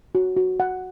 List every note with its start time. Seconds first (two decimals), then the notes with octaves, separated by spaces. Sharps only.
0.15 F#4
0.37 F#4
0.60 F#5